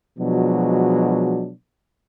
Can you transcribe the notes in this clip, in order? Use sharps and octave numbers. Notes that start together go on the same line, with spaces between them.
B2 F3 F#3 G#3 D4